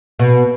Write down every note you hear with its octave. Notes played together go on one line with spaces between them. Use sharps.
B2